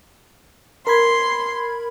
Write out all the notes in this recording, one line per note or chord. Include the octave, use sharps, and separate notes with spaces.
A#4 B5 C6 G#6